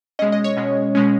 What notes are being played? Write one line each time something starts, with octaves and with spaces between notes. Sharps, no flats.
B2 G#3 C#4 D#5
D#5
C#5
B2 G#3 C#4
B2 G#3 C#4